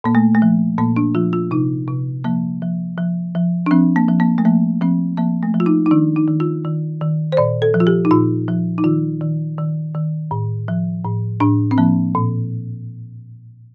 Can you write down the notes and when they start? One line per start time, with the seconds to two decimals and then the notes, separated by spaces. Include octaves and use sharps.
0.04 A#2 A#3
0.15 A3
0.35 A3
0.42 F3
0.78 A#2 A#3
0.97 D4
1.15 F3 F4
1.33 F4
1.51 C3 D#4
1.88 C3
2.24 F3 A#3
2.62 F3
2.98 F3
3.35 F3
3.66 D4
3.71 F3 C4
3.96 A#3
4.08 F3
4.20 A#3
4.38 A3
4.45 F3 A#3
4.81 F3 C4
5.17 F3 A#3
5.43 A3
5.54 F3
5.60 F4
5.66 D#4
5.86 D#4
5.91 D#3 D4
6.16 D#4
6.28 D#3
6.40 F4
6.65 D#3
7.01 D#3
7.32 C5
7.37 A#2 D5
7.62 A4
7.74 F3
7.80 F4
7.87 G4
8.05 D#4
8.11 A#2 F4
8.48 F3
8.78 D#4
8.84 D#3 F4
9.21 D#3
9.58 D#3
9.95 D#3
10.31 A2
10.68 F3
11.04 A2
11.40 A2 D4
11.71 C4
11.78 F3 A#3
12.15 A#2